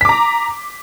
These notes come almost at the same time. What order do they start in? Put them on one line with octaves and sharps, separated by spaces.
B6 D6 A#5